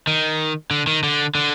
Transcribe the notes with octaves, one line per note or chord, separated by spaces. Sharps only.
D#3
D3
D#3
D3
D3